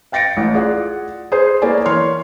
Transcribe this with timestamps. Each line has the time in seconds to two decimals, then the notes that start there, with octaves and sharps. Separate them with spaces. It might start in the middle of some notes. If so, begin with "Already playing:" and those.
0.12 F5 G5 A6 A#6 C#7 D7
0.37 A1
0.54 F4 G#4 D5 F#5
1.32 G#4 B4 C5
1.62 A#3 B3 E4 C#5 D5 G#5
1.86 E3 C#5 C6 F6